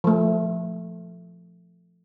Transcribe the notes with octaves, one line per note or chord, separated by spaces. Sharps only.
F3 A3